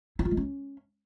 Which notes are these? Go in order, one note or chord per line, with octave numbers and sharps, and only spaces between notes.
E4
F4
G#3
C#4